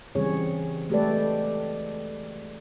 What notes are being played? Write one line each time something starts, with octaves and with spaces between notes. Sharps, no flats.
C#3 E3 G3 C4 G#4 C#5
G#3 A3 G4 A4 B4 D5